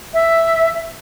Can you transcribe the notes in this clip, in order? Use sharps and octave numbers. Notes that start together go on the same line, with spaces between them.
E5